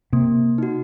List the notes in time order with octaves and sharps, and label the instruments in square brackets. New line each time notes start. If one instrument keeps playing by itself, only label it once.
[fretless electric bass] C3 [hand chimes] A#3
[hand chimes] D#4 F#4